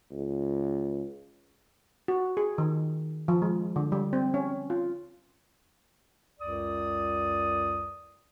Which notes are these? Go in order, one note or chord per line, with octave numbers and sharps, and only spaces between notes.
C#2
F#4
G#4
D#3
F3
G#3
D3
G3
C4
C#4
F4
C#2 F#2 D5 D#6